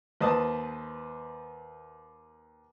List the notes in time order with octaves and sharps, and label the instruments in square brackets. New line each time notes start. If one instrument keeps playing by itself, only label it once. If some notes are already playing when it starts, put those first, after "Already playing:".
[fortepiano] D#2 B4 C5 D#5 A5 D#6